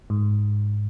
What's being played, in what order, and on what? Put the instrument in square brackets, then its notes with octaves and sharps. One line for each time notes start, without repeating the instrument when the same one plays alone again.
[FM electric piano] G#2